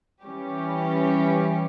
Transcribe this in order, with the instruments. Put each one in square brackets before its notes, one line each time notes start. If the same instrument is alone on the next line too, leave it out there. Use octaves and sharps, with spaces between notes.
[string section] E3 G3 C#4 G4